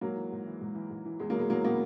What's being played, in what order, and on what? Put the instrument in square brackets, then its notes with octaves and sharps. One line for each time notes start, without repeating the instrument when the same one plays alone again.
[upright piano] G#2 F#3 A#3
E3
G#2
E3
G#2
E3
G#2
E3
E2 G#3
F#3 A#3
B2 G#3
E2 F#3 A#3
B2 A#3 C#4